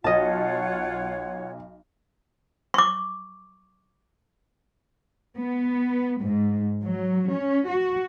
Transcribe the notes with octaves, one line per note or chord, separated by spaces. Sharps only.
B1 F4 C#5 D#5 F#5 A5
C#6 D6
B3
G#2
F#3
C#4
F#4